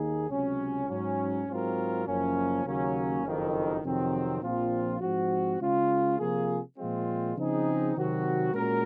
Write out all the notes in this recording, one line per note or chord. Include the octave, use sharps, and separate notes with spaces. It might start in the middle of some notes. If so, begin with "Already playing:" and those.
Already playing: D#2 D#3 A#3 D#4 G#4
C#2 C3 F#3 C#4
G#2 F#3 C#4
G#2 F#3 C4 F4 A#4
F#1 F#2 F3 A#3 C#4
D#2 C#3 F#3 A#3 C#4
F#1 F2 D#3
F2 C3 D#3 F#3 C4
A#1 A#2 F3 C4 F4
G#2 F3 C4 F#4
C#3 G#3 C#4 F4
C3 F3 A#3 F4 G#4
A#2 F3 G#3 C4 F4
C#3 F3 C4 D#4 G#4
C3 D#3 F#3 C4 F#4
A#2 G#3 C#4 F#4 A#4